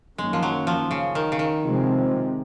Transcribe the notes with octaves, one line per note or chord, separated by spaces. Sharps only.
F#2 D#3 G#3 A#3 C#4
F3
F#3
F3
C#3
D#3
C#3
D#3
C3 F3 G#3 C4